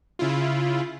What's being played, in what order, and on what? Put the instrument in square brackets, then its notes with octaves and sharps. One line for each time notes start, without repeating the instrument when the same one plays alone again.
[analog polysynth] C#3 E4 F4